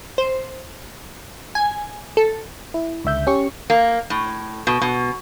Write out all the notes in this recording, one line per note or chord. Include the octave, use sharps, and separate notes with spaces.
C5
G#5
A4
E4
C#2 D3 E5 G6
C#4 G4 C#6
A#3
A2
B2
B2